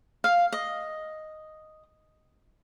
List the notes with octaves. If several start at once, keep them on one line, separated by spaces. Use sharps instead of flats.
F5
D#5